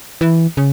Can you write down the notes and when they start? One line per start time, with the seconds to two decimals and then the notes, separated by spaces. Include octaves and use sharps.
0.21 E3
0.57 C#3